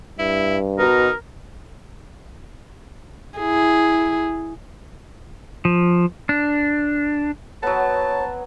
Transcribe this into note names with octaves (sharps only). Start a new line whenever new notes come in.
G2 E4
B2 D#4 A#4
E4 G#4
F3
D4
F#3 B3 C#5 A5